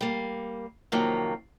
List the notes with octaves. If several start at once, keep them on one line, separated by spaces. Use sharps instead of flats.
G3 A#3
F2 C3 D#3 F3 F#3 A#3